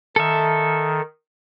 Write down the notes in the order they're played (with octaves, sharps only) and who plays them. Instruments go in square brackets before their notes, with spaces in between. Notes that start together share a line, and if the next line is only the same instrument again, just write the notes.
[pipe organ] D#3 [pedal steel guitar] A4 E5